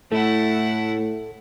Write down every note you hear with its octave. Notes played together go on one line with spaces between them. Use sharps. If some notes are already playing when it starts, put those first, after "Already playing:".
A2 A3 E4 A4 F#5